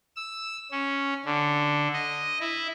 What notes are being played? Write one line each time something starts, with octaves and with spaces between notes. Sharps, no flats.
E6
C#4
D3
D#5
E4